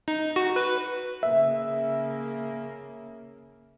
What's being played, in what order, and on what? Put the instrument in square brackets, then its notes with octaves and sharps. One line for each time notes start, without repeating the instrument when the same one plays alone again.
[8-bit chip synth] D#4
F#4
B4
[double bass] C#3 A#3 [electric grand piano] E5